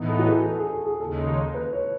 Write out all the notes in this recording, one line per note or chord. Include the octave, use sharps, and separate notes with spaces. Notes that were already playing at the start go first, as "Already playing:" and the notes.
Already playing: A2 E3 B3 D#4
A4
F#4
G#4
A4
G#4
A4
G#4
D#2 C#3 G#3 D#4 A4
B4
C#5